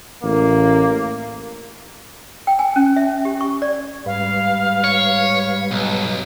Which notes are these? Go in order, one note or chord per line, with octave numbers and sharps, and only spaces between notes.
A1 A#3
G5
G#5
C#4
E5
G4
C#6
D5
G#2 G3 B4 F5
C#5
B1